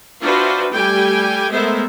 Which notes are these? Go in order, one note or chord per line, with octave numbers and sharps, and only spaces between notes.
D4 F4 F#4 B4 C5 E5
G3 A3 G4 G5 G#5
G#3 A3 B3 A#4 C5 E5